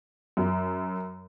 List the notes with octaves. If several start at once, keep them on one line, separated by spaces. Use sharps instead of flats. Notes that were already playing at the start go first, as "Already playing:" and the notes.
F#2